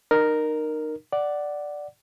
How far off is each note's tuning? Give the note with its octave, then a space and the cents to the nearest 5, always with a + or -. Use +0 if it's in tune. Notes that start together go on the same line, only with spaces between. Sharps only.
D#4 -30 A#4 +0
D5 +0 F#5 +10